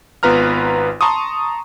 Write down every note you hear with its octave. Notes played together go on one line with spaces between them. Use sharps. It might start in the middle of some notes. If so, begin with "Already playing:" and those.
G#1 B3 F4 B4 A#5 F6
A5 A#5 C6 C#6 D#6